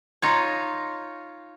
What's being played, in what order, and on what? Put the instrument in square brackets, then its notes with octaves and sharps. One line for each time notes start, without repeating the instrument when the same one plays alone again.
[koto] D#4 F4 C#5